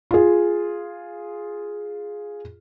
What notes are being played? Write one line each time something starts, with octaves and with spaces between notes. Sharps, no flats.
F4 G#4